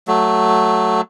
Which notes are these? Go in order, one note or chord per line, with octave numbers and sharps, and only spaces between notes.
F#3 A3